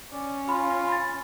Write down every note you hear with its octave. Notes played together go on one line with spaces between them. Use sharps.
C#4 D5
F4 B5 C6
B5 A6